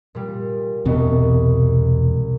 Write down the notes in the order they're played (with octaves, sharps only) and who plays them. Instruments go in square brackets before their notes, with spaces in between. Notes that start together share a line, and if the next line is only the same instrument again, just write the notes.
[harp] A#2 G3
[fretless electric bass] E1 B2 B3 [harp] C2 D#5